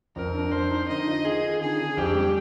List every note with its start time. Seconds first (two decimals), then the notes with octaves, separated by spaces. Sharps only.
0.16 F2 A#4
0.34 D4
0.52 F2 C5
0.71 D#4
0.88 D3 D#5
1.07 F4
1.25 D#3 G#4
1.43 F4
1.61 D3 G#4
1.79 D4
1.97 F2 G4
2.15 G3